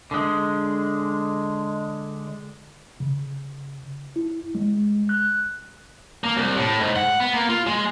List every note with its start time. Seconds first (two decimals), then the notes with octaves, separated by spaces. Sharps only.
0.11 D3 G#3
3.00 C#3
4.16 E4
4.55 G#3
5.09 F#6
6.24 A#3
6.37 C2
6.56 A2
6.79 G#2
6.96 F#5
7.20 B3
7.34 A#3
7.49 F4
7.67 G#3